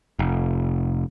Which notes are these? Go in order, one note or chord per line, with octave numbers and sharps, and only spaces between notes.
F1